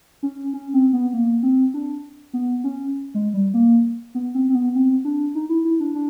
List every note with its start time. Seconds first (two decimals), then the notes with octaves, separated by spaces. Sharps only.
0.23 C#4
0.53 C#4
0.74 C4
0.93 B3
1.13 A#3
1.43 C4
1.74 D4
2.34 B3
2.64 C#4
3.14 G#3
3.34 G3
3.54 A#3
4.15 B3
4.35 C4
4.49 C4
4.55 B3
4.75 C4
5.05 D4
5.35 D#4
5.49 E4
5.65 E4
5.80 D4
5.95 D4